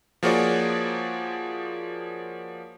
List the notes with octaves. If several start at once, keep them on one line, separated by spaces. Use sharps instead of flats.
F3 A#3 F#4 G#4 C#5 D5